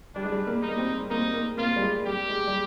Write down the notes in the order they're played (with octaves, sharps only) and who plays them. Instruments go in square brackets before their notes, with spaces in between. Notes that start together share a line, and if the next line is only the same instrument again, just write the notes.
[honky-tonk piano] G3 [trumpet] D4
[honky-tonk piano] G#3
G3
A#3
[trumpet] D#4
[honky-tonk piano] A#3
C4
[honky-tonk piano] A#3 [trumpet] D#4
[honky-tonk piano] A#3
[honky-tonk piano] A#3 [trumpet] F4
[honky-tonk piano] G3
G#3
[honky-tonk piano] G3 [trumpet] G4
[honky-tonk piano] G#3
G3